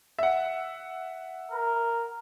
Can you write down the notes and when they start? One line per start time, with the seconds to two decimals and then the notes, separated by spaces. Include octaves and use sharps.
0.19 E5 F#5
1.52 A#4